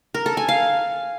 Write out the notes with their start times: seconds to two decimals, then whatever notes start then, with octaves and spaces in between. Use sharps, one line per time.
0.14 A#4
0.26 A4
0.37 G#5
0.49 F5